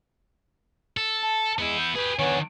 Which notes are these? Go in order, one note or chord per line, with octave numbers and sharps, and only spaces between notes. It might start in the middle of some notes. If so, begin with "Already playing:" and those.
A4
A5
G#3 B3 E4
G6
G4 G#4 B4
D#3 B3 D4 C#5 G#5